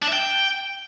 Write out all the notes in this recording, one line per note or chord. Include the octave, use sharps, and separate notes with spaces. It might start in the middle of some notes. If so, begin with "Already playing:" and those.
D4
E5
G5